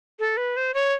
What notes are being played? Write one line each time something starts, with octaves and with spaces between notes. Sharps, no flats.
A4
B4
C5
C#5